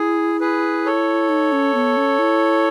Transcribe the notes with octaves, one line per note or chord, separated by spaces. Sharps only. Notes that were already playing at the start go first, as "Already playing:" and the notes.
Already playing: E4 G#4
G#4 B4
A4 C#5
D#4
C#4
B3
C#4
E4